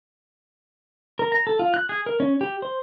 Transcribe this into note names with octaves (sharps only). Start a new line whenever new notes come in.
A#4
A#5
A4
F4
F#6
G#4
A#4
C#4
G4
C5